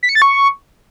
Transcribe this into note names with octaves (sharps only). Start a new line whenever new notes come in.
B6
C#7
A6
C#6